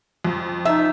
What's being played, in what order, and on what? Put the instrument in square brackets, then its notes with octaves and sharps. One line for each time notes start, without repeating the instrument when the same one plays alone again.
[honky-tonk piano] F2
[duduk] D#4 [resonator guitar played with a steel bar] E5